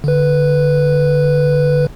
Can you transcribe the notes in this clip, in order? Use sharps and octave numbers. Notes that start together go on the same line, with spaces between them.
D3 B4